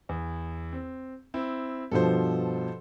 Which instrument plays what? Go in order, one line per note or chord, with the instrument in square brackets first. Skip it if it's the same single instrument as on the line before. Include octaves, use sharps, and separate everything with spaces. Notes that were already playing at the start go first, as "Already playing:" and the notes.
[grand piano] E2
C4
C4 E4
[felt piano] G2 B2 F3 [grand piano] A4 C5